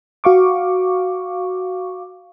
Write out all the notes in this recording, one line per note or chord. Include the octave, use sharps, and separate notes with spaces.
F#4 F5 C#6 D6